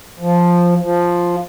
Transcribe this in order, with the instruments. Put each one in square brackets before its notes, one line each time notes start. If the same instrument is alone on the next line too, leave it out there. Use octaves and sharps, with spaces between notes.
[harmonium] F3
F3